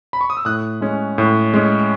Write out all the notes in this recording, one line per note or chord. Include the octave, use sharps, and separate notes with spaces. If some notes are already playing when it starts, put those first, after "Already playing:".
B5
C#6
D#6
E6
A2 D#6 F#6
G#3 C#4
A2
G#3 C#4